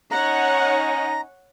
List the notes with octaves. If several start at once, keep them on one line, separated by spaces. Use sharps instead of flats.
C#4 D#4 C#5 F#5 A#5